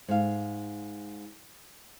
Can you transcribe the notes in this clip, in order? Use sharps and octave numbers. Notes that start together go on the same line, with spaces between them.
G#2 F5